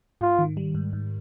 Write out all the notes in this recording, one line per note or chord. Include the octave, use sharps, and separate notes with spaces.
G#2 F4
D#3
G3
G#2
G#2